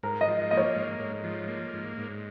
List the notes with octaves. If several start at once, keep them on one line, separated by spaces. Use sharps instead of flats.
G#2 A#4
D#5
F3
A#3 D#5
C#5
G#2
G#2
F3
A#3
G#2
G#2